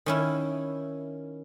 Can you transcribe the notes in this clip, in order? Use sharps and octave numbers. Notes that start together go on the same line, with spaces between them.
D#3 C#4 E4